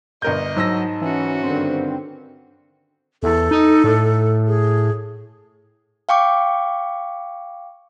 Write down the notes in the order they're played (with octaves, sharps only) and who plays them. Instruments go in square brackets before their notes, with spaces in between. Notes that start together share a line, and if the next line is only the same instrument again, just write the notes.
[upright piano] G1 A#4 G6 [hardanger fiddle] D#5
[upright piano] G#2 E6 A#6 [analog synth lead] F#3 [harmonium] A5
[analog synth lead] E3 [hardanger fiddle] C#4 F#4
[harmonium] G2 D3 D#3 [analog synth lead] C4
[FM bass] E2 [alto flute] A4
[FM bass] D#4
A2
[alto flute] G#4
[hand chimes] F5 G5 C#6 D6